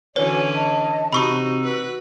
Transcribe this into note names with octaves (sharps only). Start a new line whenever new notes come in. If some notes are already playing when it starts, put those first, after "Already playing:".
D3 E3 C#4 F#4 B4 C#5 D5 G#5
D#5 A5
C3 D#4 F#4 B5 C#6 D#6 E6
F#4 B4